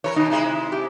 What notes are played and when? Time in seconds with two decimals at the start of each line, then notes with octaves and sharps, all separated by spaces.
0.04 E3 A4 A#4 C#5
0.16 B2 D#3 D#4
0.30 C3 G#3 E4
0.72 G4